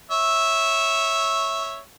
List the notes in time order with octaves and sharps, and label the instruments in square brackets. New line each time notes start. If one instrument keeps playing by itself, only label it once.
[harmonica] C#5 E5